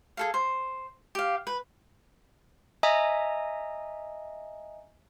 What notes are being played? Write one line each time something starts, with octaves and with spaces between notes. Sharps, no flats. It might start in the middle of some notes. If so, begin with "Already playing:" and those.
G#4 A4 F5
C5
G4 F5
B4
D#5 E5 G#5 A#5 D#6